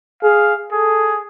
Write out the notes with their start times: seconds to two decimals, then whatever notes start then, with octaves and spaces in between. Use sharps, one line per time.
0.23 G#4 F5
0.72 G#4 A4